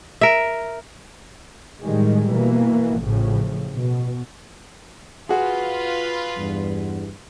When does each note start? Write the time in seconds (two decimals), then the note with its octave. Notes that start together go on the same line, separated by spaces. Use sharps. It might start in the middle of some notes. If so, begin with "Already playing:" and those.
0.21 A#4 E5
1.81 A2 D#3 G3 G#3
2.31 B2 E3 A#3
2.98 A1 A2 C#3 F3
3.70 B2
5.29 F4 F#4 G#4 B4
6.37 E2 G2